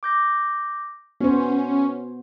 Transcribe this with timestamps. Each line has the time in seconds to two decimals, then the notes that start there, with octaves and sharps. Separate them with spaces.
0.03 D6 G6 A#6
1.21 B3 C#4 F#4 C5